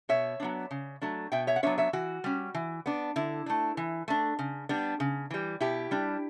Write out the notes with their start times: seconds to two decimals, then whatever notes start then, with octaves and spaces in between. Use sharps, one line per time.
0.09 B2 C#5 E5
0.40 F#3 B3 D4
0.71 C#3
1.02 F#3 A3 D4
1.32 B2 E5 G5
1.47 C#5 E5
1.56 F#5
1.63 F#3 B3 D4 C#5 E5
1.78 C#5 E5
1.93 E3 F#4
2.24 G3 C#4
2.54 E3
2.86 B3 D4
3.16 D3 E4
3.46 A3 D4
3.77 E3
4.08 A3 D4
4.39 C#3
4.69 G3 B3 D4
5.00 C#3
5.30 E3 G3
5.61 B2 E4 G4
5.91 G3 D4